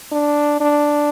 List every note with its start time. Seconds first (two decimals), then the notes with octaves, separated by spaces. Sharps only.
0.12 D4
0.60 D4